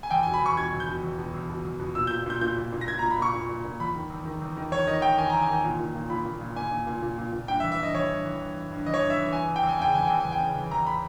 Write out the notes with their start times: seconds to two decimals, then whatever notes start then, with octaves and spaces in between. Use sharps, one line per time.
0.03 G#5
0.11 E2 G5
0.23 G#5
0.27 B2
0.34 B5
0.41 E2 C#6
0.57 B2 G#6
0.73 E2
0.80 G6
0.88 B2
1.03 E2
1.18 B2
1.34 E2
1.50 B2
1.65 E2
1.80 B2
1.95 A#2 E6
2.07 G6
2.11 A#2
2.26 A#2 G6
2.41 A#2 G6
2.57 A#2
2.72 A#2
2.81 A#6
2.87 A#2 G#6
2.99 A#5
3.03 A#2
3.11 B5
3.18 A#2 C#6
3.34 A#2
3.49 A#2
3.64 A#2
3.80 E2 B5
3.95 D#3
4.10 E2
4.26 D#3
4.41 E2
4.57 D#3
4.72 E2 C#5
4.87 D#3 D#5
5.02 E2 G5
5.18 D#3 G#5
5.30 E2 A#5
5.42 G#5
5.49 D#3
5.64 A#2
5.79 A#2
5.95 A#2
6.10 A#2 B5
6.25 A#2
6.41 A#2
6.56 A#2 G#5
6.71 A#2
6.87 A#2
7.02 A#2
7.18 A#2
7.33 A#2
7.48 G2 G5
7.60 E5
7.64 E3
7.72 E5
7.80 G2 D#5
7.94 E3 C#5
8.10 G2
8.25 E3
8.41 G2
8.56 E3
8.71 G2
8.86 E3 D#5
8.94 C#5
9.01 G2 D#5
9.10 E5
9.18 E3
9.33 E3 G#5
9.48 E2
9.56 G5
9.63 E2
9.69 G#5
9.79 C#3 G5
9.94 E3 G#5
10.07 E2 G5
10.20 E2 G#5
10.32 G5
10.40 C#3
10.56 E3
10.71 E2 A#5
10.86 B5